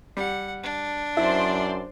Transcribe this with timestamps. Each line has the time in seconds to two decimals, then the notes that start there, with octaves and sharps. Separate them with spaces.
0.17 G3 F#5
0.64 D4
1.17 F#2 E4 C5 D5 C6